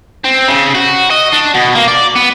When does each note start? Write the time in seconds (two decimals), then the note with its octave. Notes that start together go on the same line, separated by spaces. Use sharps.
0.24 C4
0.48 C#3
0.75 F#4
1.10 D#5
1.33 D4
1.54 B2
1.75 A#3
1.88 D5
2.16 B3